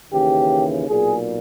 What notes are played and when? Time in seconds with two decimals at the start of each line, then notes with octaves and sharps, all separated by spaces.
0.11 D#2 C#3 E3 G4
0.88 B1 A#2 G#4